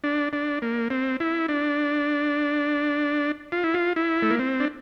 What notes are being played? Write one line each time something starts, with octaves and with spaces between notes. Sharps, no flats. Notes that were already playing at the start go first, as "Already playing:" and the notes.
D4
D4
A#3
C4
E4
D4
F4
E4
F4
E4
A3
A#3
C4
D4